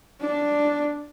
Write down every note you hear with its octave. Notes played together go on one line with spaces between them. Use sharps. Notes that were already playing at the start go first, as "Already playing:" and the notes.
D4